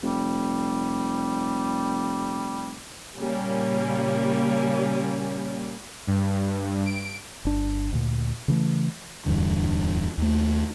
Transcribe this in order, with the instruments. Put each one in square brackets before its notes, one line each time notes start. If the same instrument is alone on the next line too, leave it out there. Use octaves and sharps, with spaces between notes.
[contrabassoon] F1 [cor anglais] G3
[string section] A#2 C#3 G3 A#3 C#4
[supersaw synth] G2
D7
[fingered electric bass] G1 D4
D2 A#2
C#3 E3 A3
D1 E2 G2 D3
D#2 A3